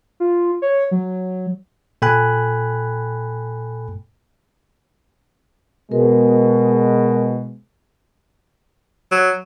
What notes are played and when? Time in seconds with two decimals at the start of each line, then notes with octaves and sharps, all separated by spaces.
0.20 F4
0.62 C#5
0.91 F#3
2.02 A#2 A4 G5 G#5 B5 F#6
5.92 B2 G#3 A#4
9.12 F#3